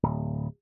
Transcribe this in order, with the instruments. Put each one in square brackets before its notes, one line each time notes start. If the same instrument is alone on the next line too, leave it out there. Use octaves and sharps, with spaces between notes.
[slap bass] D1